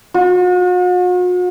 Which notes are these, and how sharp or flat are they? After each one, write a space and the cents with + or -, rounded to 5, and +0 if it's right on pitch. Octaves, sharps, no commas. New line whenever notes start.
F#4 -45